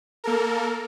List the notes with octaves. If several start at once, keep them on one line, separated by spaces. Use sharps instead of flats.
A#3 A4 A#4